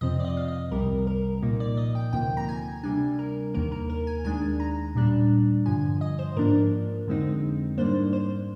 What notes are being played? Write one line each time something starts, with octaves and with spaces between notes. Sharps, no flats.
F2 C3 F3 C4 D#5
D5
D#5
F5
D#5
C2 C3 G3 A#4
A#4
A#2 F3 A#3 D#4
D5
D#5
G5
D2 C3 F3 A#3 G5
A#5
G#5
C3 G3 D4 G#5
A#4
D#2 D#3 A#3 A#4
A#4
A#4
G#5
D#2 D#3 G#3 D4 G#5
A#5
A#2 G3 D4
G2 D3 F3 G#5
D#5
C5
G#2 F3 A#3 D4 A#4
F2 D3 G#3 C4 D#4
G#2 G3 A#3 D4 C5
C5